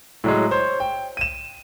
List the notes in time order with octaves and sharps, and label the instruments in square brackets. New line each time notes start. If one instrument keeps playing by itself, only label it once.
[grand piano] A2 F#3 G#3
C5 C#5
G5
D#7 E7